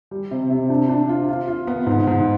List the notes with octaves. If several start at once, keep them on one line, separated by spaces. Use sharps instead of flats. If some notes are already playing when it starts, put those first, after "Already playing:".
G3
C3
C3
D4
D4
F4
F4
F4
B3
G#2
G#2